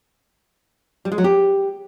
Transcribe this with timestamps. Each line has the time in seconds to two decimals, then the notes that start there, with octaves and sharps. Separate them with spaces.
1.05 G3
1.12 G#3
1.18 F#3
1.24 G4